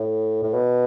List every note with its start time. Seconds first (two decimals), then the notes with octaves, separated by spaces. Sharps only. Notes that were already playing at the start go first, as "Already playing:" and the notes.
Already playing: A2
0.43 A2
0.54 B2